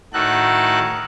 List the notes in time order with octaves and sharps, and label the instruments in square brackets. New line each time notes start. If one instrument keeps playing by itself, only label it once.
[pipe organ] A2 D#3 F#4 A4 F#6